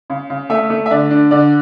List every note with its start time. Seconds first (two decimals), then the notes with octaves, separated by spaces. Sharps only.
0.10 C#3
0.30 C#3
0.50 A3 E5
0.70 A3
0.86 E5
0.91 D3 D5
1.10 D4
1.31 D3 D5